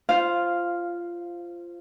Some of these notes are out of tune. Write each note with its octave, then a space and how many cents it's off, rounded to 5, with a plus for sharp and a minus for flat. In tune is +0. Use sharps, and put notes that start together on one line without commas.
F4 -15 C5 +0 F5 +0